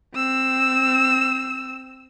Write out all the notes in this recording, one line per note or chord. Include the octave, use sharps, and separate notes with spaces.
C4 E6